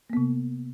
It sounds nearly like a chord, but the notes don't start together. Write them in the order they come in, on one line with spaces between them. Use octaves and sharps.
A#3 B3 C3